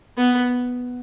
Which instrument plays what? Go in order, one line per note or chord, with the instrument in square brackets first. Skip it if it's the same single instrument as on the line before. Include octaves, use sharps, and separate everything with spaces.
[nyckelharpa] B3